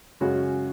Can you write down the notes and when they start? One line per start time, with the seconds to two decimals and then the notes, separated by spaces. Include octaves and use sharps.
0.21 F#2 C#3 G#3 C#4 F#4